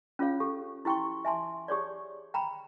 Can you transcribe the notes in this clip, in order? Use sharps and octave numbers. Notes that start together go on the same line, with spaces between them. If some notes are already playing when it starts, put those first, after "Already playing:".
C#4 F4 G#4 C#5 F5
G4 A4
E4 G4 G5 C6 C#6
E5 G#5 A5 C6
G4 G#4 C#5 D5
G5 A#5 B5